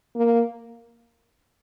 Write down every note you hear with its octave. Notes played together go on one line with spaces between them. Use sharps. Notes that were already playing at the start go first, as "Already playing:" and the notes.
A#3